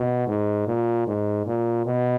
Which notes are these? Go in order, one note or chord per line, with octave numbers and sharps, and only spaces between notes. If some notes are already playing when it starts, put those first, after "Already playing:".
Already playing: B2
G#2
A#2
G#2
A#2
B2